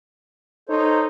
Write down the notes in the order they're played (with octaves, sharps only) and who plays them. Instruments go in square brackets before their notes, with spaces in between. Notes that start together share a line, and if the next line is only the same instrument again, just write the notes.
[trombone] D#4 [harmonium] A4 C5 C#5